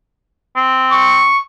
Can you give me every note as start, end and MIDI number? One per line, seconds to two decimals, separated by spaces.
0.56 1.28 60
0.91 1.40 85